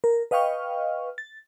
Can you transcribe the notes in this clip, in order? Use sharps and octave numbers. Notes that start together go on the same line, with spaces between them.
A#4
B4 D#5 F5 G5 C#6 F6
A6